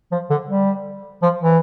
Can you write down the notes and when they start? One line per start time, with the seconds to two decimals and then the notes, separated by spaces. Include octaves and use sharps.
0.12 F3
0.30 D3
0.48 G3
1.23 F3
1.41 E3